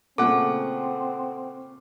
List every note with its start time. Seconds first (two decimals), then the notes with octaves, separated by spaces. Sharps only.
0.18 A#2 C#3 A3 C4 A4 F#5 D6